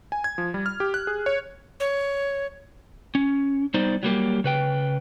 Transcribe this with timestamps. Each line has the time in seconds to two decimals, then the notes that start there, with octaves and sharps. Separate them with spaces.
0.12 G#5
0.24 G#6
0.38 F3
0.54 G3
0.66 F6
0.80 G4
0.94 F#6
1.07 G#4
1.26 C#5
1.80 C#5
3.15 C#4
3.74 G3 B3 D#4 C5 D5
4.03 F#3 G3 A#3 G4
4.44 C#3 B4 G5